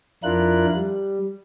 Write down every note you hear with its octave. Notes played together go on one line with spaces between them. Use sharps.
F2 D4 E4 F4 A#4 F#6
G3